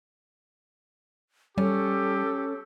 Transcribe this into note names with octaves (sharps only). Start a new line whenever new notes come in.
G3 C#4 G4 A4